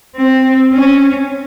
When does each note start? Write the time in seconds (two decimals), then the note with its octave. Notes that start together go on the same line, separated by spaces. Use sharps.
0.17 C4
0.73 C#4